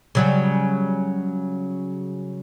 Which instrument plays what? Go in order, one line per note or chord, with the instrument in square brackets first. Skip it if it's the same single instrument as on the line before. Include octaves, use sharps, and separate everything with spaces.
[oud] C#3 F#3 G3